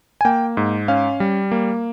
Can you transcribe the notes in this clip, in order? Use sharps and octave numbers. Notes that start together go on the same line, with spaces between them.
G#5
A#3 G5
G#2
C#4 F5
G3
A#3